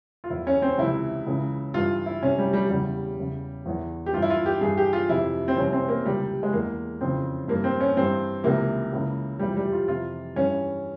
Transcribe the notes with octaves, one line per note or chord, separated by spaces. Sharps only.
F4
E2 E3 E4
C#4
C4
C#2 C3 E3 E4
C#2 C#3 E3
G2 E3 F4
E4
C2 C3 E3 C#4
G3
G3
E2 C#3 E3 G3
E2 C#3 E3
E2 E3
G4
G2 E3 F4
E4
F4
G4
G2 E3 G#4
G4
F4
F2 C3 E3 E4
C4
C2 C3 E3 C#4
C4
A#3
C#2 C3 E3 G3
G#3
E2 E3 A#3
F2 C#3 E3 C4
G2 E3 A#3
C4
C#4
G2 E3 C4
C#2 C3 E3 A#3
C#2 C#3 E3
F2 C3 E3 G3
G3
F4
F2 C3 E3 F4
G2 E3 C#4